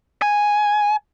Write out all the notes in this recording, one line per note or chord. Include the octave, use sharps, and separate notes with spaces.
G#5